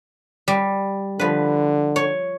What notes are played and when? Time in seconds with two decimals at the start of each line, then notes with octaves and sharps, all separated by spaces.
0.48 G3
1.19 D3 F3 B4
1.96 C#5